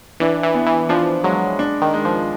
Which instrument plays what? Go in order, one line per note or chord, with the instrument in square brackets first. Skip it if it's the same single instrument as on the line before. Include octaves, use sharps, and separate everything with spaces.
[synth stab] E3 [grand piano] D4
[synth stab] E3
[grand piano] B3
[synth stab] E3
[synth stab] F3 [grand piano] D4
[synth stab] F#3 [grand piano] G#3
[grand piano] D4
[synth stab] D#3
[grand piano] G#3
[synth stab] F3